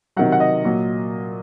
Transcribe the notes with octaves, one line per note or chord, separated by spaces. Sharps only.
C3 D#3 F#3 F#5
F#5
D#5
A#2 F#3